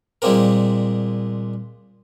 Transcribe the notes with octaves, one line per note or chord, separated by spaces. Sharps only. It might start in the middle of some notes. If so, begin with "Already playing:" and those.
A#2 G3 G#3 A#3 C4 A#4